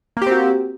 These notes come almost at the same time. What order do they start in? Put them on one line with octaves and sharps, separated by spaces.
A#3 G4 C4 F#4